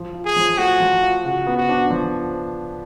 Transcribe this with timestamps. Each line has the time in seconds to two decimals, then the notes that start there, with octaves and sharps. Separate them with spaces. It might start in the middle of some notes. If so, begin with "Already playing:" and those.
Already playing: F3
0.14 F4
0.25 G#4
0.36 F3
0.58 A3 F#4
0.80 F3
1.02 F4
1.25 C#3 F#4
1.47 B3
1.57 F#4
1.69 D4
1.90 F3